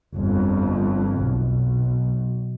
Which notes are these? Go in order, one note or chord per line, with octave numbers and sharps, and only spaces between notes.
G1 F2
B1